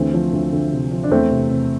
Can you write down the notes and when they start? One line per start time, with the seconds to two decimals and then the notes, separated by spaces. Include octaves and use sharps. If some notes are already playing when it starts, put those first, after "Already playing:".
Already playing: D2 E3 A3 C4
0.14 F3
0.33 D2
0.53 D2
0.72 C3
0.91 F3
1.03 D4
1.11 E2 A3 C4
1.31 C3
1.51 C3